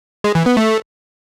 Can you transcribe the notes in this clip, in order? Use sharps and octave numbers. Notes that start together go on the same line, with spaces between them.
G#3
E3
B3
A3